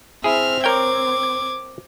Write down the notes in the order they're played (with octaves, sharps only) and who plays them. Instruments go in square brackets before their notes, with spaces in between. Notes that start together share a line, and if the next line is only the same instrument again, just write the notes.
[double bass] C4 [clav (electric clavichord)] E4 G#4 [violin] E5 F6
[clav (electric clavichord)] A#4 C#5 G5 [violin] D6 G#6